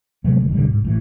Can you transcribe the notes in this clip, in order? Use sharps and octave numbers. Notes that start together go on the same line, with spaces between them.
C3 F#3 G#3 A3
F#1 D#3
D#1 B2 D3 G3
G#2
A1 A2 E3